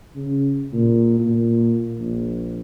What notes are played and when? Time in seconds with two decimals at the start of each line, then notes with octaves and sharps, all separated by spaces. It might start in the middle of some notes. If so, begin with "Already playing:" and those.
0.16 C#3
0.73 A#2
1.20 A#2
1.99 A#1